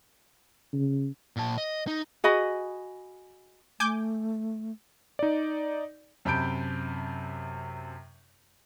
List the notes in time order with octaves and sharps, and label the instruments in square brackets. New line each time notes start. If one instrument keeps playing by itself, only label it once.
[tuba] C#3
[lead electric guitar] A#2 A5
D#5
D#4
[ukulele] F#4 G#4 D#5 B5
[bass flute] A3 [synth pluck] G#5 D6 G6
[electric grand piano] D#4 D5
[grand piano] F#2 C3 A5 B5 G6 D7